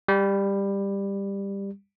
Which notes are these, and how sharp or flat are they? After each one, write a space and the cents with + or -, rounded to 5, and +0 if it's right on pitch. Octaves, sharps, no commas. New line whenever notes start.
G3 +15